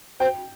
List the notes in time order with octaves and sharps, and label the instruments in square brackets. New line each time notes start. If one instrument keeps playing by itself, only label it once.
[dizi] C5 [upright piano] G5